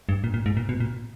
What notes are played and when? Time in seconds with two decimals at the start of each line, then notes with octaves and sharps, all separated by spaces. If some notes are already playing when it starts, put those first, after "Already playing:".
0.09 G2
0.24 A#2
0.34 A#2
0.46 G#2
0.57 A#2
0.69 B2
0.80 A#2